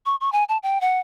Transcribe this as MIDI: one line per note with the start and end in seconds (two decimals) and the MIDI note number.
0.06 0.16 85
0.21 0.32 85
0.32 0.44 80
0.49 0.58 81
0.63 0.80 79
0.81 1.00 78